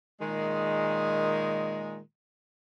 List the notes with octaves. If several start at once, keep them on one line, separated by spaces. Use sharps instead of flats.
A#2 D#3 G#3